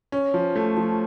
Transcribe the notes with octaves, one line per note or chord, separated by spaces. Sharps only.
C#4
F3
A3
F3